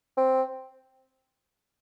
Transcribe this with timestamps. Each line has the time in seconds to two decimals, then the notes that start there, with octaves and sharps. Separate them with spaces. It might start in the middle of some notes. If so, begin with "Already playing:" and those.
0.17 C4